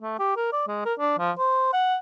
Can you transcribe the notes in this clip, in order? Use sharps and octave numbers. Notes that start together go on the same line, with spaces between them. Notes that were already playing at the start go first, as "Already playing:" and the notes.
A3
G4
A#4
D5
G#3
A#4
D4
F3
C5
F#5